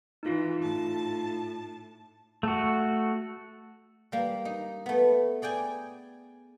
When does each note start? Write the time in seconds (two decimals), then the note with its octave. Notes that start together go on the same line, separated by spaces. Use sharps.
0.23 E3 D#4 F4
0.61 A2 A5
2.43 A3 F#4
4.12 G3 A#3
4.45 D#4
4.86 A3 B3
5.42 G#4 D5 G5 G#5